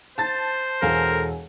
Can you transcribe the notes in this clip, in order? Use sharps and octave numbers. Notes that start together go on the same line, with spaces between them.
C5 A5 A6
E1 A4 A#4 F5 G#5